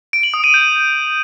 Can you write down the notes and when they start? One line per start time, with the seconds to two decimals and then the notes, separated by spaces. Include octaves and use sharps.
0.13 D7
0.23 F#7
0.34 D#6
0.44 D#7
0.54 G6